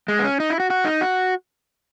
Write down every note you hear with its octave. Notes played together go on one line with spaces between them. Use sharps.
G#3
B3
C#4
D#4
E4
F#4
F#4
D#4
F#4